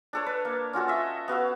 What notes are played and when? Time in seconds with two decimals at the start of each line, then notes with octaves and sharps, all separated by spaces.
0.13 D4 A4 C#5
0.26 B4
0.45 A#3
0.73 C#4 F4 F#4 A4
0.88 D#5 E5
1.28 B3 F#4 F5 E6